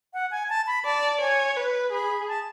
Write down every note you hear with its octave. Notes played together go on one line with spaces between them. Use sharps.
F#5
G#5
A5
B5
D5 A5
C#5 G#5
B4
G#4 B5
A5